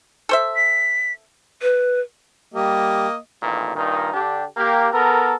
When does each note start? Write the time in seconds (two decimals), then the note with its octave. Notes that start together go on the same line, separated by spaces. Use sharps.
0.29 A4 C5 E5
0.56 B6
1.62 B4
2.54 G3 A#3 G4 D#5
3.41 A1 E2 A#2 D#3
3.76 G2 A#2 D#3 D#4
4.14 D3 D4 G4
4.57 A#3 G4
4.92 B3 A4 A#4